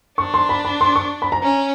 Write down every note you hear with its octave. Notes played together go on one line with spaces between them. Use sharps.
D4 C#6
C6
B5
B5
C6
C#6
B5
A#5
C#4